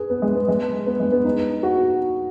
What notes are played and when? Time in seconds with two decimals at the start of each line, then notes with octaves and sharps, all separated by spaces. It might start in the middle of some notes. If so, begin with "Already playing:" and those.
Already playing: G#4 B4
0.10 B3
0.22 G#3
0.35 B3
0.48 G#3
0.87 B3
1.00 G#3
1.12 B3
1.24 D#4
1.63 F#4